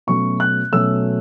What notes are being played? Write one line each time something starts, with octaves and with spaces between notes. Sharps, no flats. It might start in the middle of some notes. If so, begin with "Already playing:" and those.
B2 F#3 A3 C#4 C#6
F#6
B2 F#3 A3 C#4 E6